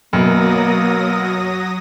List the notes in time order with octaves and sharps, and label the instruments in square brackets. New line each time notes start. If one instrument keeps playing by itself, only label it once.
[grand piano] F#2 B2 [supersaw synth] F#3 D#6 A#6 [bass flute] A#3